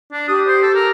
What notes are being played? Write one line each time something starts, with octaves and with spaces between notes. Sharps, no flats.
D4
G4 D#6
C5
A4
A#4